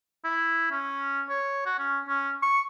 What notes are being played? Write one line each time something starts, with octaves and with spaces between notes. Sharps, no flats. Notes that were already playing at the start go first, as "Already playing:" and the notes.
E4
C#4
C#5
F#4
C#4
C#4
C#6